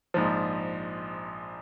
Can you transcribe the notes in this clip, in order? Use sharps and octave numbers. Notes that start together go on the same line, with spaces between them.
A#1 G#2 F3